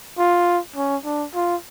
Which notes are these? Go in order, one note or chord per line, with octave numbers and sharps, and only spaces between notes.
F4
C#4
D4
F4